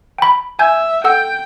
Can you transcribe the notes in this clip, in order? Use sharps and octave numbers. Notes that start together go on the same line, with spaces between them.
G5 B5
E5 G#5 G6 G#6
A4 F#5 G5 E6